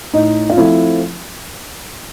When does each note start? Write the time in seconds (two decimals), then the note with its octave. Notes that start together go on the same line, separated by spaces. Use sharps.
0.13 A2 D#4
0.50 F4
0.57 F3 A3 C4 E4